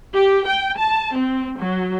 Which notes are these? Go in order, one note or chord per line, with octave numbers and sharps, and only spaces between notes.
G4
G5
A5
C4
F#3